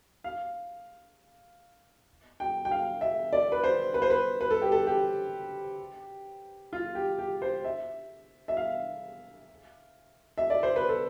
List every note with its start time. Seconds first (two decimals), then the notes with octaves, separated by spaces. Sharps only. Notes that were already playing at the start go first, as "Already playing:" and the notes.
0.24 F5
2.40 G5
2.65 G5
2.71 F5
3.01 E5
3.33 D5
3.52 B4
3.64 C5
3.94 B4
4.02 C5
4.10 B4
4.41 B4
4.51 A4
4.62 G4
4.72 A4
4.87 G4
6.73 F4
6.95 G4
7.19 G4
7.42 C5
7.65 E5
8.48 E5
8.57 F5
10.38 E5
10.50 D5
10.63 C5
10.76 B4
10.89 A4